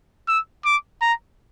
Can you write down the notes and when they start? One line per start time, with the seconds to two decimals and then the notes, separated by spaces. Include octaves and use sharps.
0.28 E6
0.65 D6
1.02 A#5